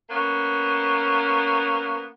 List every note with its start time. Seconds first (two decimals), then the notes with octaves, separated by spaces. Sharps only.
0.10 A#3 B3 C#4